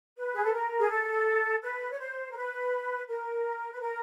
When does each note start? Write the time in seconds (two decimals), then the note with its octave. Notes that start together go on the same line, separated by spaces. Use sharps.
0.17 B4
0.34 G#4
0.43 A4
0.54 A#4
0.79 G#4
0.90 A4
1.62 B4
1.91 C#5
1.99 C5
2.31 A#4
2.36 B4
3.08 A#4
3.73 B4
3.81 A#4